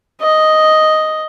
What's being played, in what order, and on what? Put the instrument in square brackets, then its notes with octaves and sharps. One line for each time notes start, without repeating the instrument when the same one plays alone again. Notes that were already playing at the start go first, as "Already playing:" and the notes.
[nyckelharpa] D#5